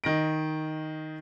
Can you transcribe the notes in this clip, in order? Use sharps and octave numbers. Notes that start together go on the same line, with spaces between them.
D#3 A#6 D7